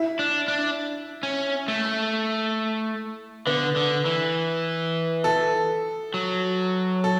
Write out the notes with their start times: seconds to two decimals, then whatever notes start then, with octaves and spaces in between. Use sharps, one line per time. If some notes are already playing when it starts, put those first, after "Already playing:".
Already playing: E4
0.19 D4
0.48 D4
1.23 C#4
1.68 A3
3.47 D3 B3
3.76 D3
4.06 E3
5.24 A4
6.14 F#3
7.04 A4